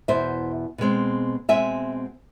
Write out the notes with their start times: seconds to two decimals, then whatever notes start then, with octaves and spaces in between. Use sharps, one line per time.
0.08 E2 B2 B3 C5 E5
0.78 B2 G#3 C4
1.49 B2 G#3 C4 E5 G#5